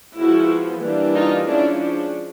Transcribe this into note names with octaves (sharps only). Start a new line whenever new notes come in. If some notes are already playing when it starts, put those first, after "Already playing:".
F3 G#3 B3 E4 F#4
E3 G3 A#3 D4
D#4 F4
F3 G#3 C#4 D4 E4
D4